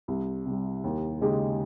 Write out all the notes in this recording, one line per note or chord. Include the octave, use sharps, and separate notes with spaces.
C2
C3 G3
D#2
C#3 G#3 D#4 G4